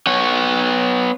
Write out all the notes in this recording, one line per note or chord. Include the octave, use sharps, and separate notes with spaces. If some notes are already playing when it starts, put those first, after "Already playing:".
B3 C#5